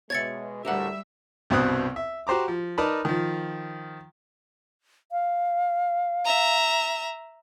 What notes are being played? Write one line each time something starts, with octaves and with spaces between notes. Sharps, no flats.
B2 G#3 C#5 E5 G#6 A6 C#7
D2 A2 G3 G4 A#4 E5 F#5
C2 G2 B2 C4 D#6 F#6
E5
F#4 G4 C5 A#5 D6
F3
D#4 A#4 B4 D5 A5 B5
D#3 F3
F5
E5 A#5